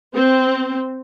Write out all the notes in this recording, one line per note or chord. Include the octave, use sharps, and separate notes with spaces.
C4